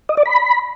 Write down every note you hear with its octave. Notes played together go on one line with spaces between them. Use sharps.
D#5
D5
B5